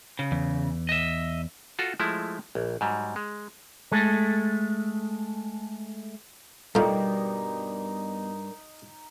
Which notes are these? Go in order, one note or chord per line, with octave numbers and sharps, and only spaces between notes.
C#3
E2
D#5 E5
F4 F#4 A4
F3 G#3 A3 E4
A#1
G#2 F#3 G3
G#3
G#3 A3 A4
G2 B2 G3 A3 D#4 F4 A#4 D5